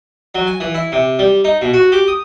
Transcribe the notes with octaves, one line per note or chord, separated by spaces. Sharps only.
F#3
G#5
E3
E4
C3
G3
D#4
B2
F#4
G4
D#6